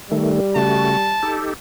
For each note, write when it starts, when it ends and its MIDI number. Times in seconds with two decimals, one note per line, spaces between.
0.11 0.40 51
0.11 1.18 55
0.11 0.40 57
0.56 0.97 49
0.56 0.97 57
0.56 0.97 66
0.56 1.42 81
1.23 1.53 63
1.23 1.53 67
1.23 1.53 69